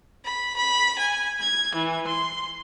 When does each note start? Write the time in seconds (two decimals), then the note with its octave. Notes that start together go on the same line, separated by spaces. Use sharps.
0.24 B5
0.55 B5
0.97 G#5
1.40 G#6
1.75 E3
2.06 C6